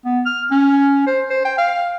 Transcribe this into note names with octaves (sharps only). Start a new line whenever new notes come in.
B3
F6
C#4
C5
C5
G5
F5